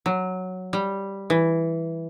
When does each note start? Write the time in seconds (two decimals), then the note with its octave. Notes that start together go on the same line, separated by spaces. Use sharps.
0.06 F#3
0.73 G3
1.30 E3